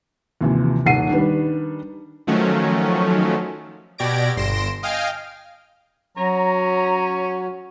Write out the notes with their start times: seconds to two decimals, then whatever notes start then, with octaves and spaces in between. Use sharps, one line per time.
0.41 D#2 C3 E3 F3
0.86 D#1 D#3 F#5 C7 D#7
1.09 D#3 G3 D4 B4
2.27 D#3 F3 F#3 A3 C#4
3.98 B2 G4 D5 G#6 A#6 D7
4.36 G1 C6 A#6 D7 E7
4.83 D#5 F5 G5 G#5 F6
6.17 F#3 C#4 A#5